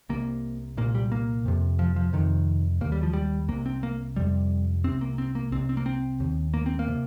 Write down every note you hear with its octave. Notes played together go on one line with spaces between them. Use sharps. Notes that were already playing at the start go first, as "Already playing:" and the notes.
C2 C3 A#3
C2 A#2 A#3
G3
A#3
F2 C3
F3
F3
F2 C3 D#3
D#2 A#3
G3
F3
G3
C2 C3 A#3
C4
A#3
F2 C3 G3
C2 C3 C4
A#3
C4
A#3
C2 C3 C4
C4
A#3
C4
D#2
A#3
C4
A#3
C3